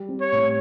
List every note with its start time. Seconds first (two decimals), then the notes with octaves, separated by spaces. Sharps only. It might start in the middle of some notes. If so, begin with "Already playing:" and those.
Already playing: G3
0.09 C4
0.21 C#5
0.32 A2